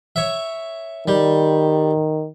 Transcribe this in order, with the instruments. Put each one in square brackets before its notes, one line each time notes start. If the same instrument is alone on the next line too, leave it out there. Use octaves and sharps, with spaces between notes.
[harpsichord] C#5 E5
[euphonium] D#3 [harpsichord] G3